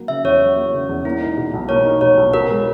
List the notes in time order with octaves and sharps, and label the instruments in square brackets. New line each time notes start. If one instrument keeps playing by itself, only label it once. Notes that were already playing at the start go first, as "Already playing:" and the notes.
Already playing: [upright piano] F#3 A#3
[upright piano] C#3 [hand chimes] E5
[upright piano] E2 [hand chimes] C#5
[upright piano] F#3
A#3
C#3
E2
[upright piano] A#3 [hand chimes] E4
[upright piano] D#4
B2
B1
[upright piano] A#3 [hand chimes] C#5
[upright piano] D#4
[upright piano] B2 [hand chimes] C#5
[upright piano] B1
[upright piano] B2 [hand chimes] A#4
[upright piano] G#3